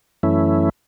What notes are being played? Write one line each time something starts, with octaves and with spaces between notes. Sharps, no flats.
F#2 E3 A3 C#4 E4